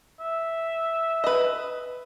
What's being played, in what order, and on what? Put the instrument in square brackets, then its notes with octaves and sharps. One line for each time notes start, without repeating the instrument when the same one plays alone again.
[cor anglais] E5
[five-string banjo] B4 D#5